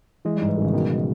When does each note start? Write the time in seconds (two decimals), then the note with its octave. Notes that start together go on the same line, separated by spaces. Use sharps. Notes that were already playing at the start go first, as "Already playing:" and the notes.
0.25 E3 G#3
0.37 G3
0.42 G#2
0.49 E3
0.57 G#1 C#3
0.73 B2 D#3